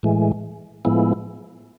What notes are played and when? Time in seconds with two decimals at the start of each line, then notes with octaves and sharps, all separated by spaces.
0.03 A2 E3 G#3
0.85 A2 F3 G#3 B3 E4